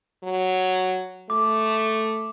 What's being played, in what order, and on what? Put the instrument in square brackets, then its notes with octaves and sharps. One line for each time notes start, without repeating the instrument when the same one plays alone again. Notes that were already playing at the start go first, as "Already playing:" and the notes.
[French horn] F#3
[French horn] A3 [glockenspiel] D6